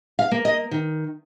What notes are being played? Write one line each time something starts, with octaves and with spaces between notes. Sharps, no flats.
F5
A#3
D#5
D#3